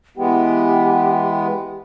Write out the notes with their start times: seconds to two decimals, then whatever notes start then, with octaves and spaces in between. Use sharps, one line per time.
0.17 E3 G#3 B3 G4 G5